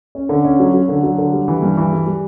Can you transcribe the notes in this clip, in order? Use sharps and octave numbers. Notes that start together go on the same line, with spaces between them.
C#4
D3
C#4
F#3
F#3
D3
F#3
D3
G3
E3
G2
E3
G3
G3